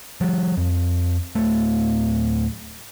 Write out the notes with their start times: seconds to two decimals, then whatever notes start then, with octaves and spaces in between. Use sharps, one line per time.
0.21 F3 G3
0.57 F2
1.35 D1 A3